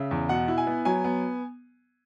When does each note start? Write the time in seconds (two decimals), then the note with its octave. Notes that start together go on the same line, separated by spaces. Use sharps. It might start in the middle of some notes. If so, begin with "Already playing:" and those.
Already playing: C#3 E5
0.11 E2
0.29 B2 F#5
0.48 E4
0.58 G#5
0.67 B3
0.85 F#3 G#5
1.04 B3